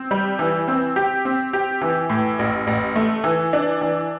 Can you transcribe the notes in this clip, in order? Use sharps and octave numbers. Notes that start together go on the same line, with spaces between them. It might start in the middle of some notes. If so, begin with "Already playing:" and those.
Already playing: C4
G3
E3
C4
G4
C4
G4
E3
A2
A1
A1
A3
E3
D4
E3